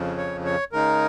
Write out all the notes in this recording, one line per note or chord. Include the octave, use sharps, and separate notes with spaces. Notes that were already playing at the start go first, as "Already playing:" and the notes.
Already playing: F2 C#3 F3
C#5
C#5
C#3 G#3 D#4 A#4